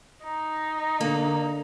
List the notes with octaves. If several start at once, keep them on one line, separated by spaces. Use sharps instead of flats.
D#4
D3 A#3